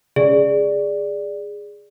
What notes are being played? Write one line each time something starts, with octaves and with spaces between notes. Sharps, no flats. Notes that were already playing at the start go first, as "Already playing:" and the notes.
C#3 G#4 D5